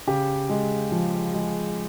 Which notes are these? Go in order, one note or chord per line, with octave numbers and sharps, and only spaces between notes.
C#3 G4
G#3
F3
G#3